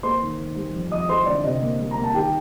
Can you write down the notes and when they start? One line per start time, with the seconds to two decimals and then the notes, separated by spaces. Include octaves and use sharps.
0.03 A#3 C5 C6
0.21 D#3
0.38 D#3
0.56 G3
0.73 F2
0.91 F2 D#5 D#6
1.09 F2 C5 C6
1.26 D3 D5
1.44 C3 D#5
1.61 A#3
1.79 G3
1.91 A#5
1.96 A#3
2.03 A5
2.14 D#3 G4 G5